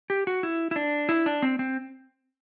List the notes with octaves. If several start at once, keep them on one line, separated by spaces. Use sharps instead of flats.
G4
F#4
E4
E4
D4
E4
D4
C4
C4